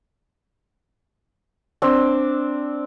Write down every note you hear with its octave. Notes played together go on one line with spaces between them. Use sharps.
C4 D4 D5